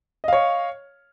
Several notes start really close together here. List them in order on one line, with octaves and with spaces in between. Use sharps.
D#5 F5 C#5